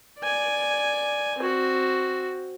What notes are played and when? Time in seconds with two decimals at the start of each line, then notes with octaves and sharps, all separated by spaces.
0.20 D5 G#5
1.38 C4 F#4